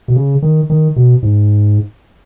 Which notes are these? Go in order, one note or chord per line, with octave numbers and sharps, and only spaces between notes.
B2
C#3
D#3
D#3
B2
G#2